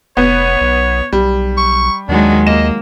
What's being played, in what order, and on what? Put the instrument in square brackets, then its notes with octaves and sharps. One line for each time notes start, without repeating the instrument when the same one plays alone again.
[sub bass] F1 [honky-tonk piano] B3 [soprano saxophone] C#5
[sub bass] B1
[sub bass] B1 [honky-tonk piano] G3
[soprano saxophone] C#6
[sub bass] D#2 [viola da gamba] D#3 F#3 G#3 [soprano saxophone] D4
[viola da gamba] A#3 [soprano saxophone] D#5 [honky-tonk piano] E7